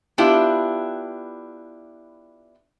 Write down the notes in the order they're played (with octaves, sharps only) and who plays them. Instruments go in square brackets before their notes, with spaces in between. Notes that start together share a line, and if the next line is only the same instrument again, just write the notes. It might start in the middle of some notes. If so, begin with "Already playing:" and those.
[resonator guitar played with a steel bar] B3 D4 E4 F4 G4